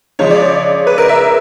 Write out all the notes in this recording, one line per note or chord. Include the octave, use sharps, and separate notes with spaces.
C#3 F3 G#3 C#5
D5
C#5
B4
A#4
E5